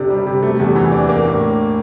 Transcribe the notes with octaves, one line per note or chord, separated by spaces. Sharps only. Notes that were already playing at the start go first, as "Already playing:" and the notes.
Already playing: C3 D4 A4
G3
C3
A3
E2
E3
D4
A#3
A2